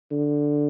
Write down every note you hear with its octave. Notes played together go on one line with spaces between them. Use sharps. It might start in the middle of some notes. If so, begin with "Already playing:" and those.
D3